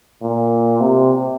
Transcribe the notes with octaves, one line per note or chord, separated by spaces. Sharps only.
A#2
C3